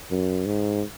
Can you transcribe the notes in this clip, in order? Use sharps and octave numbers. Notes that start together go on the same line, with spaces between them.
F#2
G#2